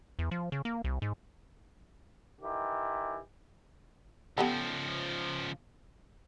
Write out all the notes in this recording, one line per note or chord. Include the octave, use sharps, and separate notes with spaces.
E2
F3
C#3
A#3
C2
G#2
D#3 E3 G4
C#2 F3 B3 G4 A4